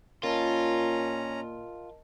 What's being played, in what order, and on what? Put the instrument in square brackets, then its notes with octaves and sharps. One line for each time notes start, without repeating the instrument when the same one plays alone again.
[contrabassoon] A#2 [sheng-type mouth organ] C#4 A#5 [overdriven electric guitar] F4 [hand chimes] A#4 D#5 A5